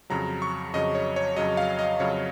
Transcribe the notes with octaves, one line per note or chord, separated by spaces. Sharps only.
F2 C#3 F#3 A#5
C#6
F2 C#3 F#3 D#5
C#5
C#5
F2 C#3 F#3 D#5
F5
D#5
F2 C#3 F#3 C#5